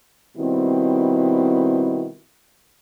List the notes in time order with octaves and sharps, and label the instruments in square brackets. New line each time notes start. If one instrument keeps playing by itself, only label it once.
[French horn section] B2 D#3 G3 C4 E4